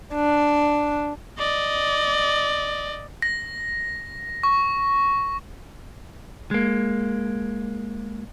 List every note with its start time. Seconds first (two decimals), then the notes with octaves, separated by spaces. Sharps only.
0.14 D4
1.39 D5 D#5
3.22 A#6
4.43 C#6
6.51 G#3 A#3